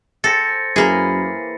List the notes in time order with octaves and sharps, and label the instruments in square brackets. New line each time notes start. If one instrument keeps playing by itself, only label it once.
[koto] A4 [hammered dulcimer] C5 G5 G#5 [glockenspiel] A6 A#6 C#7
[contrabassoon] F#2 [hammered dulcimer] E3 B4 [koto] A#3 G#4